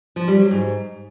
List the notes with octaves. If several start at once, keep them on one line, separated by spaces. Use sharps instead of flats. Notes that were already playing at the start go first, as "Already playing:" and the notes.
F3
G3
F#3
G#2